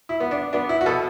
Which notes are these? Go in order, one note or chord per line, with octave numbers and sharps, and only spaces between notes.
E4
B3
D4
B3 D4
E4
F#4
B2 A4